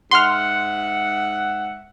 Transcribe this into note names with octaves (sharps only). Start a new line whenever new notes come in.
G#2 E5 F#5 C6 F6